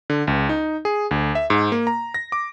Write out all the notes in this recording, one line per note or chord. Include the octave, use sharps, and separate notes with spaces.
D3
C#2
D#4
G#4
D2
E5
G#2
A#3
A#5
A#6
D6